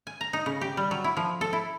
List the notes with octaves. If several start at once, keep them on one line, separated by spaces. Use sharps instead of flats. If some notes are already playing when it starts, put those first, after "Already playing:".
G#5
A#5
D#4
C#3
G4
G3
F#3
E4
F3
A4
E4